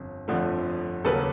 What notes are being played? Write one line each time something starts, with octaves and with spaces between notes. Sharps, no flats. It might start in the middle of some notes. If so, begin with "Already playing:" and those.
Already playing: G1 F2
G1 F2 D3 F3 A3
D#2 C#3 F#3 A#3 C#4 A4 B4